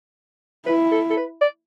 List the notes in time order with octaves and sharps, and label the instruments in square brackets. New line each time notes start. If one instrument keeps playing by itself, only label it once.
[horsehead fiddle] E4 [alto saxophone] B4
[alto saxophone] A4
A4
B4
D5